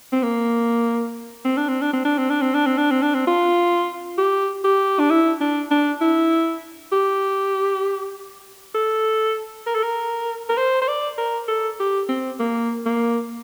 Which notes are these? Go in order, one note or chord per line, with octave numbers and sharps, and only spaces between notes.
C4
A#3
C4
D4
C4
D4
C4
D4
C4
D4
C4
D4
C4
D4
C4
D4
C4
F4
G4
G4
D4
E4
D4
D4
E4
G4
A4
A#4
A4
A#4
A#4
C5
C5
D5
A#4
A4
G4
C4
A#3
A#3